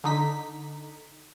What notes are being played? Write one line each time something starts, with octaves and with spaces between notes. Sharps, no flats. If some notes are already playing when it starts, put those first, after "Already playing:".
D3 D#4 B6